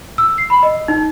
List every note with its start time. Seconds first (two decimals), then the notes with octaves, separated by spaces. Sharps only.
0.18 E6
0.38 C7
0.50 B5
0.63 D#5
0.88 D#4